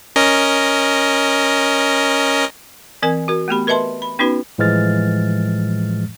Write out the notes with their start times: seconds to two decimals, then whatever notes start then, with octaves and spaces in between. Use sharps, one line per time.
0.16 C#4 A#4 D#5
3.03 E3 C4 A#4 G#5
3.28 F#4 A#4
3.48 A3 B3 G4 B5
3.67 A#4 B4 D#5 E5 A5 C6
4.02 B5
4.19 B3 C#4 D#4 F#4 B4
4.58 A2 E3 F3 G#3 F6 A6